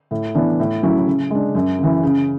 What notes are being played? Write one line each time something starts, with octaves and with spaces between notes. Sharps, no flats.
A2
E3 B3 D4
A2
F#3 C#4 E4
C#3
G#3 D4
F#2
C#3 E3
C#3